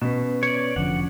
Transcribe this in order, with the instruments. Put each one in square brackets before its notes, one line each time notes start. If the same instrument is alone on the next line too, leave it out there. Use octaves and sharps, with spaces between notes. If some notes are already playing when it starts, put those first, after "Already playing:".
[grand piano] B2 [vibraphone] C#4 B4
[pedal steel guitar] C#5 D5
[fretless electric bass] F1 D3 F3 [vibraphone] C#4 D4 [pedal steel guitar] F#5